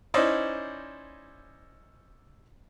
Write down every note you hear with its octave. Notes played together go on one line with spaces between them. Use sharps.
C#4 D#4 E4 C5 D5 D#5